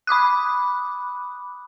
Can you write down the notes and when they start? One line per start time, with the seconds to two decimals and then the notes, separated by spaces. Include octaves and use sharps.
0.07 B5 D6 D#6 F#6